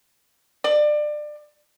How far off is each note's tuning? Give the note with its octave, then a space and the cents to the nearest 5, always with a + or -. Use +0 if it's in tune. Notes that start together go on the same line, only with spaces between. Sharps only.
D5 +25